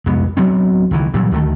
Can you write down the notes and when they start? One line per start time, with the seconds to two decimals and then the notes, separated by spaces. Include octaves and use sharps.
0.06 C2 F2 G#3 B3
0.37 D2 F#3 B3 C4
0.91 C#2 D#3 E3
1.14 A#2 E3 F#3 G3
1.32 D2 D#3 G3 A3